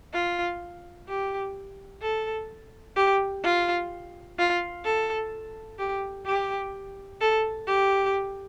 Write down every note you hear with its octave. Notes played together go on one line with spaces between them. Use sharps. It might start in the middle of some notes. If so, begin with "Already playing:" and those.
F4
G4
A4
G4
F4
F4
A4
G4
G4
A4
G4